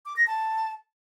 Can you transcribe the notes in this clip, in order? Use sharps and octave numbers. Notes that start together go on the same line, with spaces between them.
D6
A#6
A5